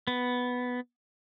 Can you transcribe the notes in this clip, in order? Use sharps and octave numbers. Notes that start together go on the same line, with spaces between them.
B3